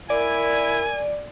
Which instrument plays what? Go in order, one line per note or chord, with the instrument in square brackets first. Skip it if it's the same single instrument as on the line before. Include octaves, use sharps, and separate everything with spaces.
[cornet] E4 [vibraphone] A#4 [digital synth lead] D5 [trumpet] G#5